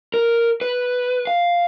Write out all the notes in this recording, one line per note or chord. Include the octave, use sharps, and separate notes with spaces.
A#4
B4
F5